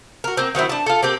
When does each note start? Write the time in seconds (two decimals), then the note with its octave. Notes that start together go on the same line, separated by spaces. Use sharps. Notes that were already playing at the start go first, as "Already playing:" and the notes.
0.24 F#4 A#4
0.37 A#3 C4
0.55 D#3 F#3 C4 E4
0.69 D4 A5
0.86 F4 A4
1.02 A#3 C4 G4